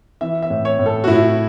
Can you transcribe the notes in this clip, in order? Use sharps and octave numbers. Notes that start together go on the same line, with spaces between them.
E3 E5
E5
A2
C#5
A2
A4
F#4
A2 E4